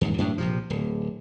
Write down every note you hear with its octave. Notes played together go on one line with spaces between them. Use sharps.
D#2 G#2
F#2 A2 D4
A#1 C3 F3
D1